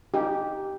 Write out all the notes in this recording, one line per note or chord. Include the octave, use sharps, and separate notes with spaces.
D#4 G4